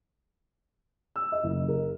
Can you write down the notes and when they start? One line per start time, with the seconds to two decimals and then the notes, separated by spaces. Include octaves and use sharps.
1.16 E6
1.32 D#5
1.43 F#1
1.68 A#4